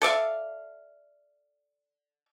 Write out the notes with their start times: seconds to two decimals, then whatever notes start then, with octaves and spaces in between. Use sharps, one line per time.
0.02 A4 D5 E5 F5